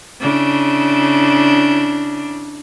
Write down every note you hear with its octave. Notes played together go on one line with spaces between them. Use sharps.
C#3 D4 E4